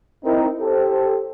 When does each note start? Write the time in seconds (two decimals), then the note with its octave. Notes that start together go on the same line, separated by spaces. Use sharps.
0.24 C4 D#4 E4 A#4
0.60 G4 A4 C5